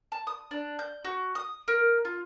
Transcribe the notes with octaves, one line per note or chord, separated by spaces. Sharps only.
A5
D#6
D4
G6
F#4
D#6
A#4
F4